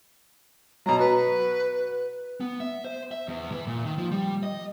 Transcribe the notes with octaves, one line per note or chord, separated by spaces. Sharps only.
B2 F#3 A#5
F#4 B4
B3
E5
C5
E5
E2
E3
A#2
D#3
F3
G3
D#5